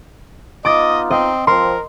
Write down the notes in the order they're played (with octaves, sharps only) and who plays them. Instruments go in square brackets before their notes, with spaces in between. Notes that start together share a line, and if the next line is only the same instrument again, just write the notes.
[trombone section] B3 D#4 F4 [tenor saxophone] D#5 [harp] D6 A6
[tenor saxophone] C4 [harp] D#5
[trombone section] F3 C4 [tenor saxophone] A#4 [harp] C6